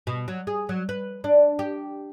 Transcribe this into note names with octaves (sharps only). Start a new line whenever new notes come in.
B2
F#3
G#4
F#3
B4
D4
G4